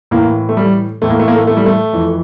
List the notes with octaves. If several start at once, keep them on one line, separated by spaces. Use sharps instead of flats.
A2 E3 A#3
A3
G3
A2 E3 A3
A#3
A3
A#3
A3
A3
G3
A3
F2 E3